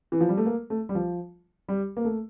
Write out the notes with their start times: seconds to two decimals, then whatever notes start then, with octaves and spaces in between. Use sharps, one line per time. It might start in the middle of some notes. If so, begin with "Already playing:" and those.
0.12 E3
0.21 F3
0.29 G3
0.37 A3
0.46 A#3
0.70 A3
0.89 G3
0.95 F3
1.68 G3
1.97 A#3
2.05 A3